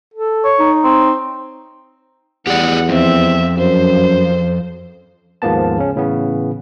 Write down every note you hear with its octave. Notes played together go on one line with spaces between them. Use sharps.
A4
C#5
D#4
C4
E2 G4 G#4 D5 F#5
F2 C4 E5
F#2 C5
D#2 G#2 F3 A#3 B3 A5
C#3 C#4
A2 C#3 E3 B3